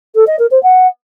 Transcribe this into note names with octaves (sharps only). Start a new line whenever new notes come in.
A4
D#5
A#4
C5
F#5